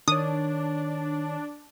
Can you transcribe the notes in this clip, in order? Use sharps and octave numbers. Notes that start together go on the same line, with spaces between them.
D#3 D4 C#5 D#6